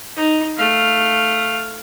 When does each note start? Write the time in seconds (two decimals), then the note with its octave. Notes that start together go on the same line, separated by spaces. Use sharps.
0.16 D#4
0.57 A3 F5